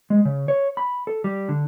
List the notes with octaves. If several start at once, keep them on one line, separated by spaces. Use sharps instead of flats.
G#3
C#3
C#5
B5
A4
G3
D3